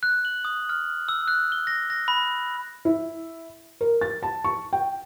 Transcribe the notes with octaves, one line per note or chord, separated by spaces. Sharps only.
F#6
F#7
D#6
F6
E6
F#6
G7
A#6
A#6
B5
E4
A#4
A6
A5
C#6
G5